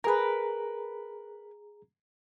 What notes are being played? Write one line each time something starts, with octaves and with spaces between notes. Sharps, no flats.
G#4 A#4 B4 A#5